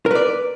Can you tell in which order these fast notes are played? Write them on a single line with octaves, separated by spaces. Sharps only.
A#4 B4 D5